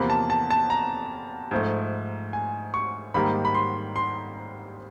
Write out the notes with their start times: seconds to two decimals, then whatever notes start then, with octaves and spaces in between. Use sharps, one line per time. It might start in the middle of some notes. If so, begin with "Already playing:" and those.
Already playing: E2 C3 F3 A#3 B5
0.10 A5
0.30 A5
0.50 A5
0.70 A#5
1.51 G#2 F3 A3
2.33 G#5
2.74 C#6
3.14 G#2 D#3 G3 A#3 B5
3.45 B5
3.54 C6
3.96 C6